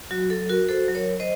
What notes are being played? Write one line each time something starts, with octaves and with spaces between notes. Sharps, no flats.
F#3 F#4
F#3 A4
F#4 A#4
F#4 A4 C5
F#3
A#4 C#5
F#3
C5 D#5